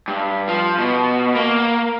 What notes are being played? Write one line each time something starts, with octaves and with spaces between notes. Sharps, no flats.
G2
F3
B2
A#3